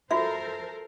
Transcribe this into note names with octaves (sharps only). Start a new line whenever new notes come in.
F4 F#4 A4 A#4 C5 E5